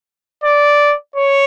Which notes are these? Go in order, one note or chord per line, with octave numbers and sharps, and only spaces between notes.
D5
C#5